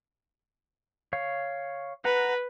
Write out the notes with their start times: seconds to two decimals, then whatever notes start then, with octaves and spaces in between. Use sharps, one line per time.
1.13 C#5 F5
2.05 B4 F#5 A#5